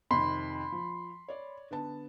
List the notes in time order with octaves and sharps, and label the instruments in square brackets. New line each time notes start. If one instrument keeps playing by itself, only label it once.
[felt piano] F2 C3 D#3 [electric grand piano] B5 C6
[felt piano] F3
C#5 D5
D3 B3 A5